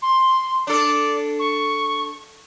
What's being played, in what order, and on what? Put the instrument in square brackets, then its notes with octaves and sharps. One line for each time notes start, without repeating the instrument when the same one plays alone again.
[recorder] C6
[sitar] D4 A4 [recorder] D5
[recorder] C#6